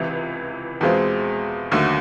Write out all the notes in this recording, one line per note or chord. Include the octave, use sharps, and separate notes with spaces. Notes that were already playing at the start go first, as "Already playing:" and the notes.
Already playing: C#2 C3 E3
E2 B2 G#3 C4 F4
D#2 D3 F#3 A3